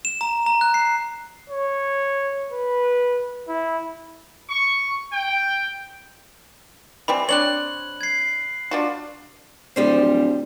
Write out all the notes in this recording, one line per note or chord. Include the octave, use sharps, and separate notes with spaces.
E7
A#5
A#5
F#6
C7
C#5
B4
E4
C#6
G5
E3 G3 C4 B5
C4 D4 C#5 F#6 F#7
G#6 C7
D4 F4 F#4
D1 F3 G3 C5